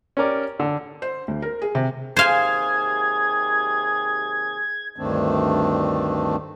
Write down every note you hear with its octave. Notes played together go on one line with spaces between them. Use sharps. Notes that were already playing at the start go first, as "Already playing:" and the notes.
C#4 G4 A#4 D5
D3
C5
D2
A#4
G#4
C3
D#2 C3 G#4 C5 F5 G#5 G#6
D2 G2 D#3 A3 C4 D4